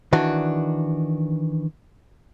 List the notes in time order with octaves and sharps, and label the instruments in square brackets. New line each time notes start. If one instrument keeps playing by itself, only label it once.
[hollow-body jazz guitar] D#3 E3 D4 F#4